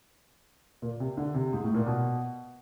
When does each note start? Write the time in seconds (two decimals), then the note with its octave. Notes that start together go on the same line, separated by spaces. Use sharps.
0.82 A#2
1.00 C3
1.17 D3
1.34 C3
1.53 G#2
1.64 A2
1.74 A#2
1.86 B2